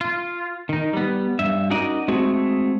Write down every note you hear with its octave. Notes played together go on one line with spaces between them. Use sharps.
F4
D#3 D#4
G3 B3
G2 E5
C#4 D#4 F#4 A#4 D5 D#5
G#3 A3 C4 F#4 G#4